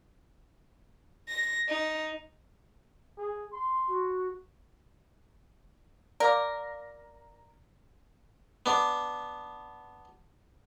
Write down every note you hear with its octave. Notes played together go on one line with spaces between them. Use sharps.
A#6
D#4
G#4
C6
F#4
A#4 D5 F5 D6
B3 D4